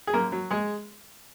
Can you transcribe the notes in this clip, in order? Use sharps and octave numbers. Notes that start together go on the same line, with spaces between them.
G#4
F#2 A#3 A#4
F#3
G#3 G#4